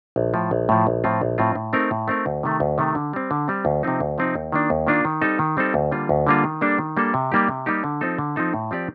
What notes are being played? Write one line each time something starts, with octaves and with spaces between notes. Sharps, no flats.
A#1
A2 F3
A#1
A2 F3
A#1
A2 F3 C4 F4
A#1
A2 F3 C4 F4
A2
A3 C4 D#4 A#4
A2
A3 C4 D#4 A#4
D2
C3 D#3 A3
D2
C3 D#3 A3
D3
G3 C4
D3
G3 C4
D2
C3 F3 C4 D#4
D2
C3 F3 C4 D#4
D#2
D#3 A#3 D4 F4
D#2
D#3 A#3 D4 F4
D#3
G3 C4 D#4 A4
D#3
G3 C4 D#4 A4
D2
D3 G3 A#3 F4
D2
D3 G3 A#3 F4
D#3
G3 A#3 D4 A4
D#3
G3 A#3 D4 A4
C3
G3 A#3 D#4 G4
C3
G3 A#3 D#4 G4
D3
F3 C4 D#4 A4
D3
F3 C4 D#4 A4
A2
F3 C4 G4 D5